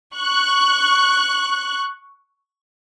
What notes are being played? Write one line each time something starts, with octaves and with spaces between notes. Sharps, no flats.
C#6 F#6